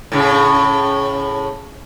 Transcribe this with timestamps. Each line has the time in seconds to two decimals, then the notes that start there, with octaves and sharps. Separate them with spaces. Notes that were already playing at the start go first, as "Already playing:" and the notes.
0.12 A2 C#3